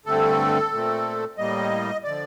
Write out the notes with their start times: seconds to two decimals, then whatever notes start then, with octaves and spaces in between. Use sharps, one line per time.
0.06 G2 D3 A3 C4 A4
0.72 A#2 A3 C4
1.38 A2 G3 A#3 D#5
2.04 D3 F3 D5